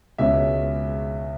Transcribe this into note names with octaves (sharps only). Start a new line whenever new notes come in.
C#2 B2 G#3 C#4 E5